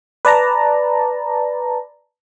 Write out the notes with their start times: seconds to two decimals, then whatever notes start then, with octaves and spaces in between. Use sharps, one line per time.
0.25 B4 D5 A5 A#5